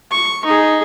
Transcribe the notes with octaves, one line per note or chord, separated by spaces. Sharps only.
C#6
D#4 G#4